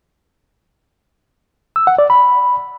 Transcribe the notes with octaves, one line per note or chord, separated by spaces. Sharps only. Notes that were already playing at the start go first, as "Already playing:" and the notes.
E6
F#5
D5
B5